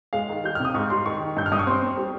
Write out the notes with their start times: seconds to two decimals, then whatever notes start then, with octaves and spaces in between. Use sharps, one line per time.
0.13 G#3 F5
0.29 D#3
0.44 G3 G6
0.55 C3 F6
0.65 D#6
0.75 G#2 C#6
0.90 G3 C6
1.06 D#3 C#6
1.21 D#3
1.37 G2 G6
1.46 F6
1.52 G2 D#6
1.59 C#6
1.67 C4 C6
1.82 C4
1.97 G3